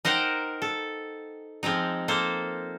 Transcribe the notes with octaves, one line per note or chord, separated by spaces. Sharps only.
D#4 A#4 C5 F#5 G5
A4
F3 G#3 C4 D#4
A#3 A4 C5